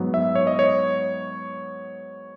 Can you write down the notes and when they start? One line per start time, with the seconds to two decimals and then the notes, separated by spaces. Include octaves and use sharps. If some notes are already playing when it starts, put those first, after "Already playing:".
Already playing: G#2 F#3 B3
0.14 E5
0.35 C#5
0.47 D#5
0.59 C#5